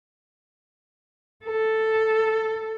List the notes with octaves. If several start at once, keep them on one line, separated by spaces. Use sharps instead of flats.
A4